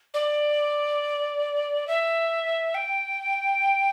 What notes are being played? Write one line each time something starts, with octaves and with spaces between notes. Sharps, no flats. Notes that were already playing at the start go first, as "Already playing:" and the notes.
D5
E5
G5